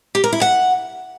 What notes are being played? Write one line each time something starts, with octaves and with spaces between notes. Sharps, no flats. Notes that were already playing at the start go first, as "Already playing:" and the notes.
G4
A#4
E4
F#5